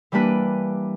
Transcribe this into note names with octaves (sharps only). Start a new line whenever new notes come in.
E3 G3 A#3 D4 B4 F#6